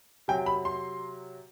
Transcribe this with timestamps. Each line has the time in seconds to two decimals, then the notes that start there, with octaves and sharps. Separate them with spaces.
0.28 C3 F#3 G5
0.46 B5
0.65 C6